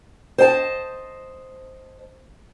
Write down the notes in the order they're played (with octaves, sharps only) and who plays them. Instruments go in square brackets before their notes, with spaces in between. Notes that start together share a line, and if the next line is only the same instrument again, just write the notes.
[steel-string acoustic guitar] C5 D#5 G5 A5